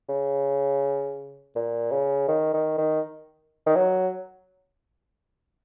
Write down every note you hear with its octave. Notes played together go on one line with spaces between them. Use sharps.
C#3
A#2
C#3
D#3
D#3
D#3
D#3
F#3